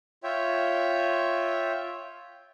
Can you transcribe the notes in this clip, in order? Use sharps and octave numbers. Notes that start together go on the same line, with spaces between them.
F4 C#5 E5 G5